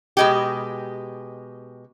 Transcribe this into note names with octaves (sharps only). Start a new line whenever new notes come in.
B2 G#3 G4